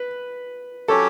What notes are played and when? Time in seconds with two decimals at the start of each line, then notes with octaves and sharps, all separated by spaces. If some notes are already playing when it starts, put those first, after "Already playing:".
Already playing: B4
0.88 F#3 C#4 G4 A4 C#5